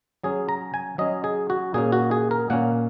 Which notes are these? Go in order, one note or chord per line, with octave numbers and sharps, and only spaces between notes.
F#3 C#4 G#4
A#5
G#5
F#3 C#4 D#5
G#4
F#4
A#2 A#3 C#4 G#4
F#4
G#4
A#4
A#2 A#3 C#4 F#5